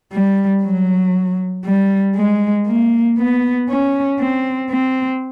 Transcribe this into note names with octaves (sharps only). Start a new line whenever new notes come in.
G3
F#3
G3
G#3
A#3
B3
C#4
C4
C4